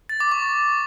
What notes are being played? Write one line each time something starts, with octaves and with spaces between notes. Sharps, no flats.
A6
D6
C#6